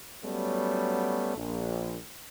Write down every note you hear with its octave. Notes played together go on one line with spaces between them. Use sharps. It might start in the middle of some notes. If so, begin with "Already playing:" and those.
F#3 G3 A3 B3 C#4
A#1